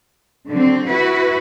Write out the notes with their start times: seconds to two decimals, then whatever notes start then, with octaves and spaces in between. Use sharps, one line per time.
0.48 D3 F#3 C4
0.87 E4 F#4 B4